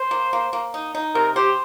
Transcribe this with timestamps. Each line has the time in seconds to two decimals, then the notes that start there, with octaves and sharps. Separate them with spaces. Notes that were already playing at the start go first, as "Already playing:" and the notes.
Already playing: C5
0.11 A#3
0.33 A#3
0.53 A#3
0.74 D#4
0.95 D#4
1.15 C3 A#4
1.36 G4 C5